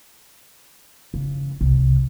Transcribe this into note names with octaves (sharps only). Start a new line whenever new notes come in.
C#3
C2